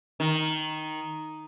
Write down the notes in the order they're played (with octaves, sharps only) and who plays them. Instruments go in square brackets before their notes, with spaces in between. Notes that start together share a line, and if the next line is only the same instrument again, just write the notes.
[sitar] D#3